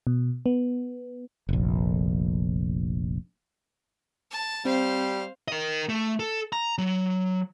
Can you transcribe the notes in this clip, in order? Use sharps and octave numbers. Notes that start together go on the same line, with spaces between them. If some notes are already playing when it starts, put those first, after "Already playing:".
B2
B3
F1 A#1
A5
G3 C4 C5 F5
A#4 D#5
A3
A4
A#5
F#3